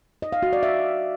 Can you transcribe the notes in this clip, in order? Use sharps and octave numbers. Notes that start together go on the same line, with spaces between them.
D#5
F5
F#4
D5
E5